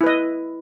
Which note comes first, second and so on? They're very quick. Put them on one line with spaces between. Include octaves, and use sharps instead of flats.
E4 B4 D#5